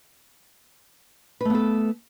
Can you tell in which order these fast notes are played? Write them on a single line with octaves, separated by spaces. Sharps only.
B4 A3 B3 A4